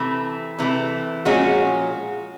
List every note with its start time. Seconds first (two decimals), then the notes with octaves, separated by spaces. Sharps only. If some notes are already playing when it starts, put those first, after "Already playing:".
Already playing: C3 E3 A3
0.59 C3 E3 A3
1.25 A#2 F3 G#3 C#4 F#4